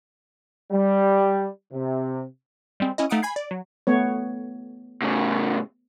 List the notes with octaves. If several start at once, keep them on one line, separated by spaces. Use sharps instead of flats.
G3
C3
G3 G#3 C4
C#4 E4 D#5
A3 D#4 F5 F#5 D#6 D7
G#5 B5 G#6 C7
D5
F#3
A3 B3 C#5
A2 C#3